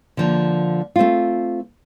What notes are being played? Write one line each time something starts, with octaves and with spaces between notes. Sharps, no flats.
D3 F3 A#3
A3 C4 F4